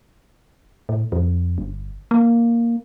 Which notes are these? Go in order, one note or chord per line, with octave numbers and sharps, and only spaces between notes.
A2
F2
G1
A#3